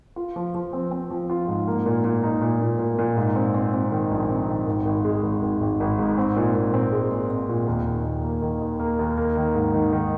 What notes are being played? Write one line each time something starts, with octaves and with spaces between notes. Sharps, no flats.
F4
F3
F3
C4
C4
F3
F4
G#2
A#3
A#2
A#2
D#4
A#2
A#2
A#2
A#2
G#2
C4
C4
C4
D#3
A#1
C4
D#3
G#1
G#1
G#3
G#1
G#1
G#1
G#1
G#2
C4
A#2
A#2
C4
G#3
A#2
C4
A#2
D#2
D#3
D#2
A#3
D#3
D#2
A#3
D#2
A#3
D#3
G#2
D#3
D#3